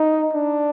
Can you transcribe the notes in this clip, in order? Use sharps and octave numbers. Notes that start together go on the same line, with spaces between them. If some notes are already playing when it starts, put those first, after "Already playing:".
Already playing: D#4
D4